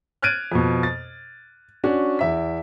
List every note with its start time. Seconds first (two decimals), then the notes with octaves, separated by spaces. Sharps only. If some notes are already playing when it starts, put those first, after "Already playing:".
0.22 F6 F#6 G#6 A6 D7 D#7
0.52 F2 B2
0.83 A6
1.84 C#4 D4 F#4
2.19 E2 E5 B6